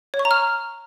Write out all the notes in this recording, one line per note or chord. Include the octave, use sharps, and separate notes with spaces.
C#5
C#6
A#5
F6